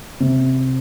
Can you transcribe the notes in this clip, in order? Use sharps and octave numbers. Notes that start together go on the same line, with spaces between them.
C3